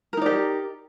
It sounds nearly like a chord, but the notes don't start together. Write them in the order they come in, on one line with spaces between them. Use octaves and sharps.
A#4 D#4 D5 G4